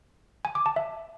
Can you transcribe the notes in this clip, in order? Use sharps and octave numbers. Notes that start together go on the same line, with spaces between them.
G#5
D6
A5
E5